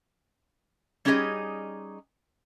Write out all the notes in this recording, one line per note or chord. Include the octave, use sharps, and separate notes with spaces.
G3 C#4 D#4 G4 G#4 D#5